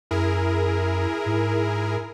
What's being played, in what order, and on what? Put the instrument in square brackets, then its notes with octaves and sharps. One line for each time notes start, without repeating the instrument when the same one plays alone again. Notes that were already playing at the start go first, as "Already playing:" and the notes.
[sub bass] F#2 [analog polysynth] E4 G#4 A#4
[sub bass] G#2